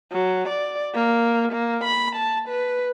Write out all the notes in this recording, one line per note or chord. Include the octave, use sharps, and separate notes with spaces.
F#3
D5
A#3
A#3
B5
A5
B4